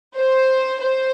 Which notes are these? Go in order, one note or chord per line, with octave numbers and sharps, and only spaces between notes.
C5
C5